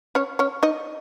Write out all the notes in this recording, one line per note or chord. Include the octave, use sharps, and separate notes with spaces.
C#4 C#5
C#4 C#5
D#4 D#5